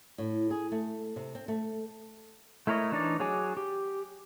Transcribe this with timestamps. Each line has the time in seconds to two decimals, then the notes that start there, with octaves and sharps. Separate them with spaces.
0.18 A2
0.51 G#4
0.72 A3
1.16 C3
1.35 C4
1.48 A3
2.67 A3 E4 A#4 C#5 D#5
2.92 E3 D4 D#4 C#5 D5
3.20 F#3 G#4 C#5 G#5 D6
3.57 G4